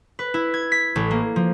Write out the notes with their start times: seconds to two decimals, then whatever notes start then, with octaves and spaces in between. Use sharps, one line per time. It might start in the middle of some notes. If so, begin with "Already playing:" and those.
0.19 B4
0.34 E4
0.54 G#6
0.72 B6
0.96 A1
1.11 A#3
1.36 F3